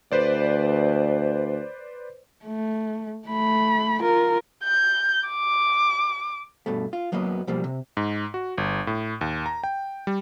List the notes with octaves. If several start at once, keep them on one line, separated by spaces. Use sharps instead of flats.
D2 B4 C5 D5
A3
A3 B5
F4 A#4
G6
D6
G2 B2 A3
F4
F#2 F#3 A#3 B3 D#5
B2 F3 G3 A#3
C3
G#2
F#4
G1
A2
D#2
A#5
G5
G3